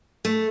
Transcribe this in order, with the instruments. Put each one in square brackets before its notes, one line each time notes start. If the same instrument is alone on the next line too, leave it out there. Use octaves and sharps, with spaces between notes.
[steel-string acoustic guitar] A3